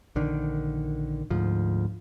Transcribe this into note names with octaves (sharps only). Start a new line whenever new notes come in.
A#1 D3 D#3
D2 G#2 F3